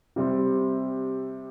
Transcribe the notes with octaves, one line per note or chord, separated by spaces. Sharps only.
C3 G3 C4